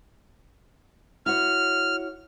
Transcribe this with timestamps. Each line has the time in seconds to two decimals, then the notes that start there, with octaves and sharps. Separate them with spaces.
1.26 E4 F#4 C#5 F6